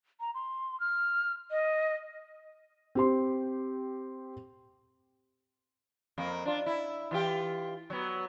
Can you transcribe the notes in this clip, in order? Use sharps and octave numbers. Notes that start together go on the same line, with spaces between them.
A#5
C6
F6
D#5
C4 G4 C6
F2 A#3
D4 F4
E4
E3 F4 G4
F#3 B3